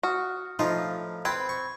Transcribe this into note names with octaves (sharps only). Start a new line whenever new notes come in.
F#4 D#6 F6
A2 F3 D#4 F4 D#5
C4 B4 G5 B5 G#6
C#6